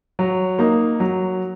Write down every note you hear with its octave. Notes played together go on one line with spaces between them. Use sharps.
F#3
A#3 D#4
F#3